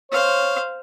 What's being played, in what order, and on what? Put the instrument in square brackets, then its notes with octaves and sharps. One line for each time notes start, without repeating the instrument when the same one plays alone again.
[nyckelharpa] C5 F5 [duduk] C#5